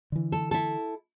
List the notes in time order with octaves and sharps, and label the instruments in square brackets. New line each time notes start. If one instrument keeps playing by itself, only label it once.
[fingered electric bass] D3 E3
[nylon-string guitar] A4
E4 A4